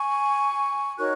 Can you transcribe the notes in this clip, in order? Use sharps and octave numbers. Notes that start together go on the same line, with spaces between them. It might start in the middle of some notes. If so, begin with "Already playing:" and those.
Already playing: G#5 C#6
D#4 F#4 A#4 C#5 C#6 F#6